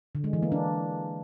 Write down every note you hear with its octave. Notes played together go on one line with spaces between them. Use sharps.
D3
G#3
E3
A#3
D4